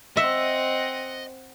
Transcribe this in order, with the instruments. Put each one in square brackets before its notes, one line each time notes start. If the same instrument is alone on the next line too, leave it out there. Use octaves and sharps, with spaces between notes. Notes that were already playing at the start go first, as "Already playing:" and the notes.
[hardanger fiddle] C4 F#5 [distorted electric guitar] D#5 [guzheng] E5